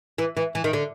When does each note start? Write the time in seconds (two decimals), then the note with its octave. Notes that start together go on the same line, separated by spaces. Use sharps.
0.18 E3
0.37 E3
0.55 E3
0.64 D#3
0.73 D3